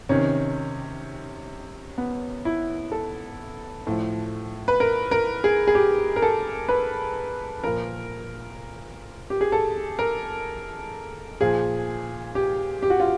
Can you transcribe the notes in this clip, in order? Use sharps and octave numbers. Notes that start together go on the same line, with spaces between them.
C3 D#3 C#4
B3
E4
A4
A2 F3
B4
A#4
A#4
G#4
G#4
G4
A#4
A4
B4
A#2 F3 A#4
G4
G#4
A4
A#4
A#2 F3 G#4
G4
G4
F#4
F4